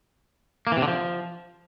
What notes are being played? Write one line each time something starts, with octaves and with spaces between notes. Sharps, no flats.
A#3
E3
C3
D3
F3